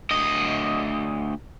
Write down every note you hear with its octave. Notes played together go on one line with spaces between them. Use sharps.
D2 D#5